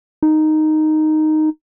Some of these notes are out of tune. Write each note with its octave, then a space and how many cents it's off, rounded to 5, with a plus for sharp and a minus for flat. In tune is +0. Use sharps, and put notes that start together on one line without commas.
D#4 -5